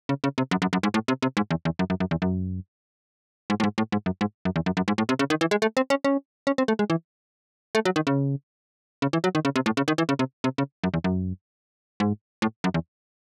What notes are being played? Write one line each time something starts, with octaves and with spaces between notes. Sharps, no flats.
C#3
C#3
C3
F#2
F#2
F#2
G#2
A2
C3
C3
G#2
E2
E2
F#2
F#2
F#2
E2
F#2
G#2
A2
G#2
A2
G#2
F#2
G#2
F#2
E2
F#2
F#2
G#2
A2
C3
C#3
D#3
E3
G#3
A3
C4
C#4
C#4
C#4
C4
A3
G#3
E3
A3
F#3
D#3
C#3
C#3
E3
F#3
D#3
C#3
C3
A2
C#3
D#3
E3
C#3
C3
C3
C#3
F#2
E2
F#2
G#2
A2
F#2
E2